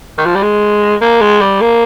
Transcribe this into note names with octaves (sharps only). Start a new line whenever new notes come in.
D#3
F3
G3
G#3
A#3
G#3
G3
A#3